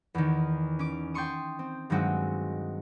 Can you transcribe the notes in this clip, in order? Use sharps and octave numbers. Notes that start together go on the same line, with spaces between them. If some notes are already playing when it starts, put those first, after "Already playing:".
E2 D#3
C#4 D6
G5 A5 C6 C#6 D#6
C4
G2 D#3 F#3 G#3 C4 F#4